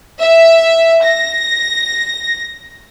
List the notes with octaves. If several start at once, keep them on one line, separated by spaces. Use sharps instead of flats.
E5
A#6